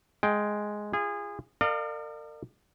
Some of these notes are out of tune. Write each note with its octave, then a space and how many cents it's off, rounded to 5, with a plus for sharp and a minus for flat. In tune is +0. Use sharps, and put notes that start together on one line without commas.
G#3 +5 G5 +0
F4 -35 G#4 -25
A#4 -35 D5 +45 F5 +0